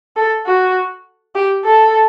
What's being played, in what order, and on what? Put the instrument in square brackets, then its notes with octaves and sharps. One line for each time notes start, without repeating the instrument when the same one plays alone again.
[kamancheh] A4
F#4
G4
A4